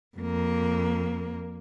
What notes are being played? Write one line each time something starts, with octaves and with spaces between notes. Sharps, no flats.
F2 A#3